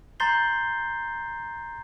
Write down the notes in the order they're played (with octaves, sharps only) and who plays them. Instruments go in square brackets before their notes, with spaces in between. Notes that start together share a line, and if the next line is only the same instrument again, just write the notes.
[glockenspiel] A#5 C6 G6 A6 C7 G7